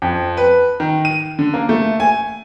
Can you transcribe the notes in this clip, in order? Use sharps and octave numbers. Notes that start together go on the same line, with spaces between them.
F2
B4
D#3
D#7
D3
A#3
A3
G#5